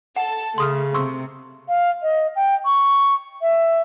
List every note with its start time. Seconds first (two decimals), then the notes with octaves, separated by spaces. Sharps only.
0.16 A4 F#5 A5
0.58 C#3 A3 C6 D#6 F6
0.94 C3 C6 C#6 E6
1.69 F5
2.03 D#5
2.36 G5
2.65 C#6
3.42 E5